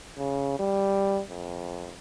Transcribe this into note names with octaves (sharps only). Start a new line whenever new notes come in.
C#3
G3
F2